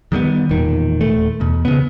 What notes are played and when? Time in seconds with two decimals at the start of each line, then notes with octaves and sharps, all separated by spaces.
0.12 D#3 G3 G#3 B3
0.49 E1 A#2 D#3
1.01 D#1 A3
1.40 E2 B2
1.65 C#3 B3